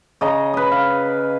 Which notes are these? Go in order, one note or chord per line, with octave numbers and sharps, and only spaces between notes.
C#3 D#5 A#5
B4 D#5
F5